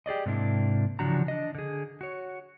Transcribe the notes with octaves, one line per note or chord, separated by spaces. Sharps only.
G4 G#4 D5 D#5
G#2 C3 A#3 D4 E4
C#3 E3 F3 D4 F#4 A#5
D4 D#5
D3 G#4
F#4 C#5